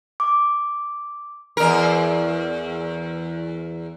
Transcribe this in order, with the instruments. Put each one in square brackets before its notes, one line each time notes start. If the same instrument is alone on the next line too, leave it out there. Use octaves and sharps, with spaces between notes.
[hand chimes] D6
[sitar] E2 A#4